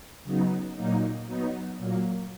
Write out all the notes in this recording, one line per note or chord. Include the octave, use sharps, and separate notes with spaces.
C#3 F#3 B3 D#4
A#2 F#3 A#3 D#4
F#3 B3 D#4
A#2 F#3 A#3